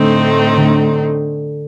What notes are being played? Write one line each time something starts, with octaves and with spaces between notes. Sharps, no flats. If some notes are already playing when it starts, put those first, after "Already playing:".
Already playing: A2 D3 A3 C4 D#4
D3